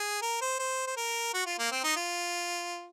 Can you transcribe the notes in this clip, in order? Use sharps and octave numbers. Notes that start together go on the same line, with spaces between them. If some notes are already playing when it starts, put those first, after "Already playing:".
Already playing: G#4
A#4
C5
C5
C5
A#4
F#4
F4
A#3
C4
D#4
F4